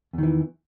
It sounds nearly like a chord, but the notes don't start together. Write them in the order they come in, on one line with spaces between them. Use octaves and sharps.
E2 D#3 E3